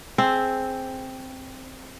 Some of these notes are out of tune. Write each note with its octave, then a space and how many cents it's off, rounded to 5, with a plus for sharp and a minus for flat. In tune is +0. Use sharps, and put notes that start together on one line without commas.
C4 +0 G#4 +15 E5 +0